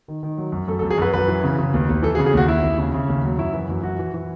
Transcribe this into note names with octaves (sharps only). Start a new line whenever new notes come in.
D#3
D#3
F#3
F#2
F#2 A4
A4
F#2
G#4
F#2 B4
F#2 B4
E3
C#3
C#3
D#2
D#2
E3 A4
G#4
C#3
G#4
D#2 F#4
D#2 E4
D#2
C#3
C#3
D#2
F#3
F#2 E4
E3
F#2
E3 F#4
E3
E3